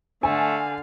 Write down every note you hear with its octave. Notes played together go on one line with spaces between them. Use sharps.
D3 A3 F5 G#5